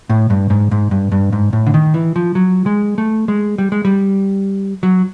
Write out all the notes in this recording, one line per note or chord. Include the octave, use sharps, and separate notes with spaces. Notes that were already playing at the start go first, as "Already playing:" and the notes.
A2
G2
G#2
G#2
G2
G2
G#2
A2
D3
D#3
E3
F3
F#3
G#3
A3
G#3
G3
G#3
G3
F#3